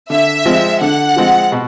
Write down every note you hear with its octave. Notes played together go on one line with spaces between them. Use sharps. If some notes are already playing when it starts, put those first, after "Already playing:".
D3 E5
F3 G#3 C4 F4
D3 F#5
F3 G#3 C4 F4
B2